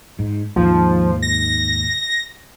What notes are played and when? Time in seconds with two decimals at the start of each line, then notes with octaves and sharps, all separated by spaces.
0.19 G#2
0.56 D#2 G#2 F3
1.22 A#6